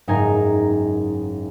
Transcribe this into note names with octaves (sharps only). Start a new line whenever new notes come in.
F#1 G#2 D#4 A#4 G#5